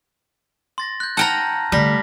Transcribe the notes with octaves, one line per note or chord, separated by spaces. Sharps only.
C6 A6 A#6
F#6 G6
F#5 G5 A5 A#5 F6 A#6
D3 G3 A3 F6 A#6 B6